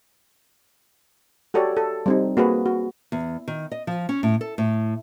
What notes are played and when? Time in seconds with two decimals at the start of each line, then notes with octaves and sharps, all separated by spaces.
1.54 F#4 G4 A4 C#5 D5
1.77 A4
2.06 G3 C4 D#4
2.37 A#3 F#4 G#4 B4
2.66 F#4
3.12 E2
3.48 D#3
3.72 D#5
3.87 F3
4.09 C#4
4.23 A2
4.41 A4
4.58 A2